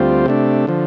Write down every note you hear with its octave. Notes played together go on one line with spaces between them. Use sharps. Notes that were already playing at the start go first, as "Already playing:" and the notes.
Already playing: D2 G3 C4 F4
C3 A3 D4
D3 F3